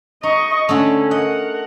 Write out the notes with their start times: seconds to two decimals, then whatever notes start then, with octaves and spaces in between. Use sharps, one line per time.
0.23 D#4 D#5 C#6
0.69 D3 A3 C#4
1.11 A#4 D#5 F#5